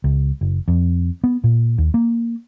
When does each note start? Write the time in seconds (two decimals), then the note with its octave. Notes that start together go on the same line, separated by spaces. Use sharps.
0.04 C#2
0.41 F#1
0.68 F2
1.24 B3
1.44 A#2
1.78 D#2
1.94 A#3